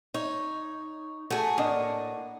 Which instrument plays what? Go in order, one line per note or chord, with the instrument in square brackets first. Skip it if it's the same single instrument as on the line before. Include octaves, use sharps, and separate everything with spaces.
[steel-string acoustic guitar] D#4 [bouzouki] C#5
[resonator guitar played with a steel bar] A3 A4 [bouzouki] F#4 G#4 [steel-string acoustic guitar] F#5
[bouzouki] A2 [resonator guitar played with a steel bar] A#3 D4 D#5